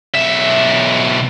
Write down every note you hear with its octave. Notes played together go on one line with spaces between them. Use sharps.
B1 E5